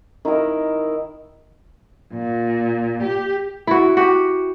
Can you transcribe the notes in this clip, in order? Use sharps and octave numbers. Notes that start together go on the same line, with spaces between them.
D#3 E4 A#4 D#5
A#2
G4
E4 F#4
F#4 G4